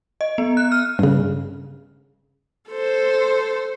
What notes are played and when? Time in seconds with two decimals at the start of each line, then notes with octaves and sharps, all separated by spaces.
0.21 D#5
0.38 B3
0.57 F#6
0.72 F6
0.99 G2 C#3
2.69 A4 C5